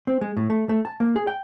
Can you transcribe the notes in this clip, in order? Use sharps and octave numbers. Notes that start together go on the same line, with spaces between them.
C4
G#3
A2
A3
A3
A5
A#3
G#4
G5